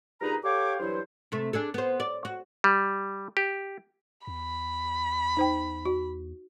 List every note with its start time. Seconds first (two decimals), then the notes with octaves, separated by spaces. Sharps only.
0.21 G2 A#2 D#4 G#4 B4 A#5
0.44 G4 A4 C#5 F5 G5 D6
0.80 G2 E3 F#3 E4 C5
1.32 C3 A3
1.53 D4 G#4 A4
1.74 B3 C5
2.00 D5
2.25 F#4
2.64 G3
3.37 G4
4.27 E2 B5
5.37 D#4 C5 G5
5.85 F#4